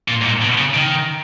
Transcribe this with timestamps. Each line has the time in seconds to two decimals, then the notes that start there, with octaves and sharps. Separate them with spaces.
0.08 A#2
0.21 G#2
0.25 A#2
0.42 B2
0.58 C#3
0.74 D#3